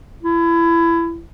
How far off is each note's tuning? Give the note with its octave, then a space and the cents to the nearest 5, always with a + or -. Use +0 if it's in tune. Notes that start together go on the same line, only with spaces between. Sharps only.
E4 +25